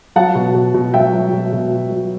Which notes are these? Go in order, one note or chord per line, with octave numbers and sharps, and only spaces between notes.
F#3 F#5 A5
B2
B2
B2
F#3 E5 G5
F#3
B2
B2
F#3
F#3